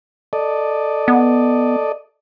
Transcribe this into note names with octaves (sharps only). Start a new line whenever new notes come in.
A4 D5 D#5
B3